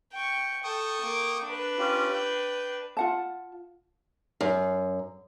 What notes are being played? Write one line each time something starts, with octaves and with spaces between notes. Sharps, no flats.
G5 C#6
A4 G5 C#6 D#6
A#3 D6
D4 B4
C#4 F4 G4
G5
F4 F#5 A5
F#2